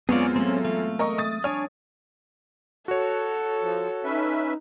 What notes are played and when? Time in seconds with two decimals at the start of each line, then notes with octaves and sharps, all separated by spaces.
0.09 F#2 G#3 B3 C4 F4 G#4 C#5 D5
0.36 F#3 A3 C4 C#4
0.65 E3 A3 F5
0.99 A#4 D#5 C#6
1.18 D#6 A6
1.44 D4 C#5 G#5 F6
2.88 F#4 A4 C#5
3.62 F3
4.04 C#4 D#4 B4 E5